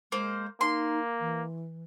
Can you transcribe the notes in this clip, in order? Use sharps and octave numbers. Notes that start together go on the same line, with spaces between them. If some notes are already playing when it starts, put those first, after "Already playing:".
G#3 A#3 C5
A#3 D#4 C6
E3